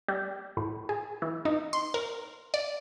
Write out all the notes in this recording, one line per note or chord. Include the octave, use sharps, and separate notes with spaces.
G3
A2
G#4
E3
D#4
C6
A#4
D5